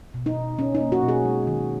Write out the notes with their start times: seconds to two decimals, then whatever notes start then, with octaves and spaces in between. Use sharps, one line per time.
0.14 B2
0.26 D#4
0.37 B2
0.59 C#4
0.75 D#4
0.80 A#3
0.92 F#4
1.02 B2
1.08 G#4
1.25 G#3
1.47 D#3